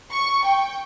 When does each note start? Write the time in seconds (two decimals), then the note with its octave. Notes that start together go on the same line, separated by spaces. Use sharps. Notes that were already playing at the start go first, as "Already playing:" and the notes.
0.12 C#6
0.44 G5